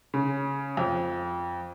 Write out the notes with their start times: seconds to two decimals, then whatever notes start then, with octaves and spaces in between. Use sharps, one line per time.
0.14 C#3
0.77 F2